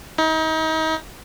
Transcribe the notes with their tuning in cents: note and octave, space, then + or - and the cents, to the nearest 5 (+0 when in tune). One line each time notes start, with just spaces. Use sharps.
D#4 +35